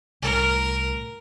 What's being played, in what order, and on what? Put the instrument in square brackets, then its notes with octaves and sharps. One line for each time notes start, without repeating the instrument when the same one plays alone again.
[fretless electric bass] C2 A2 [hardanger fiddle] A#4